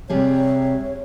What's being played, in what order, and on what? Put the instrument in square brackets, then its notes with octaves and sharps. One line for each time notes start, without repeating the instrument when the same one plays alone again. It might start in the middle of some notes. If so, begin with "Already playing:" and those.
[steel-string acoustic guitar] C3 G3 G#4 [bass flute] C#5